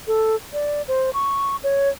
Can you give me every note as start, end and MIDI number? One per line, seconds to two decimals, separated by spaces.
0.07 0.35 69
0.53 0.82 74
0.88 1.10 72
1.14 1.56 85
1.63 1.89 73